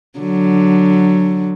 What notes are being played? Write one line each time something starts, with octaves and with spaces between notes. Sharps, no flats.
D3 F#3